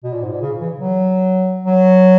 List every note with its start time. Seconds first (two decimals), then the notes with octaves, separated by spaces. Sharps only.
0.04 B2
0.13 A#2
0.22 G#2
0.32 A#2
0.41 C#3
0.61 E3
0.79 F#3
1.65 F#3